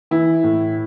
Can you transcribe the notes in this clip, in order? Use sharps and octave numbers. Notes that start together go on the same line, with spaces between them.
E3 E4
A2